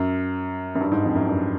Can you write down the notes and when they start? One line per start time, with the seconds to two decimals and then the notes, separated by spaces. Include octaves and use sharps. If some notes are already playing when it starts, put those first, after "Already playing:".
Already playing: F#2
0.75 F#2
0.81 G2
0.92 G#2
1.04 F2
1.15 F#2
1.27 G2